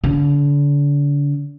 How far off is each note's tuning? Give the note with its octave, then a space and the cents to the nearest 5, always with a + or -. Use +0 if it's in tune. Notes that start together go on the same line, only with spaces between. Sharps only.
D3 -35